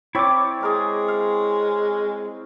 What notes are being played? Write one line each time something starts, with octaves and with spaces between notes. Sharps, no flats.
C4 E4 C#5 D5 D6
G#3 G#4 A#4
F5